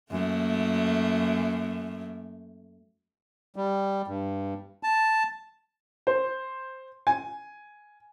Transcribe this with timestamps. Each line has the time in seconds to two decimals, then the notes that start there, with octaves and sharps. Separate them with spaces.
0.12 F#2 A3 A#3
3.56 G3
4.08 G2
4.83 A5
6.07 C5
7.07 G#5